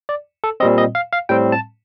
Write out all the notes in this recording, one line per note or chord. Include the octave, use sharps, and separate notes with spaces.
D5
A4
A#2 G3 C4 D#5
D#5
F5
F5
A2 G3 C4 G5
A5